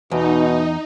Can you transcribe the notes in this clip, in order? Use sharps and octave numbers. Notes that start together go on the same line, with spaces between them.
E2 B2 D#4